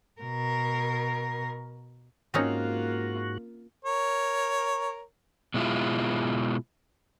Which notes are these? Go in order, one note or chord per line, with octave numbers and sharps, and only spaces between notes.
B2 A#4
G#2 A#3 C4 C#4 D#4 F4 F#4
A#4 C#5
B2 G#3 E4 F4